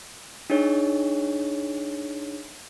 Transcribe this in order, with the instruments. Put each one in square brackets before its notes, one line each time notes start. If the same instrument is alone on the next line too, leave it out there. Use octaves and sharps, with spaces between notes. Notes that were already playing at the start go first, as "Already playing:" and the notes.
[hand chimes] D4 D#4 G#4 C#5